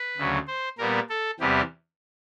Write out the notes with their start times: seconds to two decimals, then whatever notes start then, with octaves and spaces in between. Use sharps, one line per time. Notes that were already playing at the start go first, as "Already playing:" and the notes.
Already playing: B4
0.17 D2 C#3 F#3
0.47 C5
0.78 A#2 G3 B3 A#4
1.10 A4
1.40 E2 C3 E3 G3 B3 G4